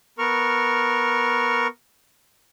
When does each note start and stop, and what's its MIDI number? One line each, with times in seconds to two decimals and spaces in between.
0.18 1.67 59
0.18 1.67 70
0.18 1.67 85
0.18 1.67 89